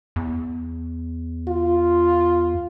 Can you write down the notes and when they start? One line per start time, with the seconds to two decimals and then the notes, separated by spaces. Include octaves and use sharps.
0.16 E2
1.48 F4